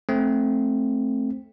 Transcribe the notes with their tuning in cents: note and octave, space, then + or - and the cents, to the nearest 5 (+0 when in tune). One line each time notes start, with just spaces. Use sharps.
A3 -5 C4 +10